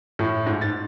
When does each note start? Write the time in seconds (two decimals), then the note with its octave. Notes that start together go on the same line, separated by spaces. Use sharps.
0.19 A2
0.46 G#2
0.61 A6